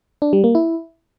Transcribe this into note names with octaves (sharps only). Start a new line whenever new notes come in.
D4
G3
A#3
E4